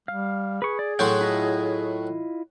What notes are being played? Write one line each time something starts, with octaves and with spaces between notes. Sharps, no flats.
G3 F5
G#4 B4 C#6
D5
A2 F#3 F#4 G5 C6
E4 F4 D#5